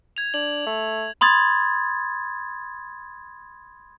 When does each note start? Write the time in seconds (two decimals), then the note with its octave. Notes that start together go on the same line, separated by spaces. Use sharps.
0.17 G#6 F7
0.34 D4 F#7
0.66 A3
1.21 B5 C6 D#6 G#6 A6